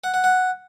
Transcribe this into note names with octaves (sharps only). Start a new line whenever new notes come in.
F#5
F#5
F#5